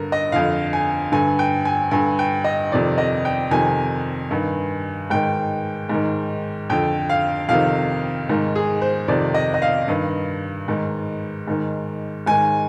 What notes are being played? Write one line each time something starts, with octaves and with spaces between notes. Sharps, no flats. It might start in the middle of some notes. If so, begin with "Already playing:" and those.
Already playing: G2 D3 A#4
D#5
F2 D3 F5
G#5
G2 D3 G#5
G5
G#5
G2 D3 G#5
G5
D#5
F2 C3 D#3 D5
D#5
G5
F2 C3 D#3 G#5
G2 D#3
G#2 D#3 G5
G#2 D#3
F2 D3 G5
F5
F2 C3 D#3 F5
G#2 D#3
G#4
C5
F2 C3 D#3 D5
D#5
D#5
F5
G2 D#3
G#2 D#3
G#2 D#3
G#2 D#3 G#5